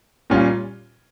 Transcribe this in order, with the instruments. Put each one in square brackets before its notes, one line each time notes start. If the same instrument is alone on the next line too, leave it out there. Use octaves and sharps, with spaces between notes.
[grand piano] A#2 G3 C#4 F4